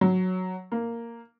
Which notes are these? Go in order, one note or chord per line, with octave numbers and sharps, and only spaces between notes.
F#3
A#3